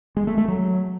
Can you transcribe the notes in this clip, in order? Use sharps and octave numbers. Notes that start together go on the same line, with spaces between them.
G#3
A3
A3
F#3